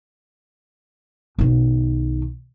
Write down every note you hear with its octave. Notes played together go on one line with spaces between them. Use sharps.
B1 D#3